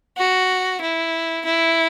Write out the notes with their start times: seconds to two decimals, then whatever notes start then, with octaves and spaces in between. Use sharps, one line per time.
0.17 F#4
0.81 E4
1.45 E4